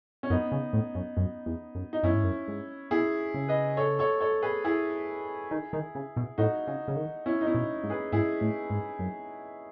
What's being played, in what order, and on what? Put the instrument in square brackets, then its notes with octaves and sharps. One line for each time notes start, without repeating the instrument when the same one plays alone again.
[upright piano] C#4
[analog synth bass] F#2 [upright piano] B3 D#4
[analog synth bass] C#3
A2
F#2
F#2
E2
F#2
[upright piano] D#4
[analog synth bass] F#2 [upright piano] C#4 E4
[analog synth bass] G#2
F#2
G#2
[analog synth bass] B2 [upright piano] E4 G#4
[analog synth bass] C#3
[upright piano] B4 D#5
A4 C#5
A4 C#5
A4 C#5
G#4 B4
E4 G#4
[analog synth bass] D#3
D#3
C#3
B2
[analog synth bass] A2 [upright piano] D#4 F#4
[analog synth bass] C#3
C#3
D#3
[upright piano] C#4 E4
D#4
C#4 E4
[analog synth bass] B2
G#2
[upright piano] G#4 B4
[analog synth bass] G#2 [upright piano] E4 G#4
[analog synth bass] A2
G#2
F#2